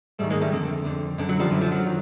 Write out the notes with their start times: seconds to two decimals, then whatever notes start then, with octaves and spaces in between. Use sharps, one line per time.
0.19 G#2 D#3 G3 A3
0.30 G#3 A#3
0.41 G3 A3
0.52 F2 D3
0.85 F2 D3
1.18 F#2 D3
1.29 F#3
1.40 F3 G3
1.51 F#2 D3 F#3
1.61 F3
1.72 F#3
1.86 D#3